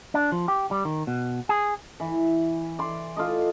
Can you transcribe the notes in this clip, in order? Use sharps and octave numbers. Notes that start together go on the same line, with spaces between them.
D4
F3
G4
G3
D#3
B2
G#4
E3
D5 C6
F4 A4 D#5